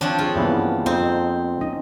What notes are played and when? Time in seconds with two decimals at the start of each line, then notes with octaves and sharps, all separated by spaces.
0.01 F3 C4 D4 C#5
0.19 F4 G#4 C#5
0.36 G2 C#3 E3 A#3 B3
0.86 F2 C4 D#4
1.61 C#4 D#4 D#5